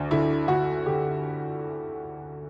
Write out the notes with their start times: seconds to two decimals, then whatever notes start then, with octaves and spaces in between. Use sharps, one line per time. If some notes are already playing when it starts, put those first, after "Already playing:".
Already playing: D2 D4
0.11 D3 E4
0.48 D2 F#4
0.86 D3 G4